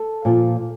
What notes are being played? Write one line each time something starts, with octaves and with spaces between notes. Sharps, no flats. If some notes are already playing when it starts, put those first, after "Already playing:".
Already playing: A4
A#2 F3